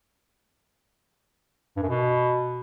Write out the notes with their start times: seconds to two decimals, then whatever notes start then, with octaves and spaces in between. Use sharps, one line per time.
1.76 G2
1.82 F#2
1.89 B2